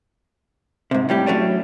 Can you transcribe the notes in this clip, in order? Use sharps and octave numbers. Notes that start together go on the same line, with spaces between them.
G#2 C3
A2 G3 G4
F#3 A3 C#4 D4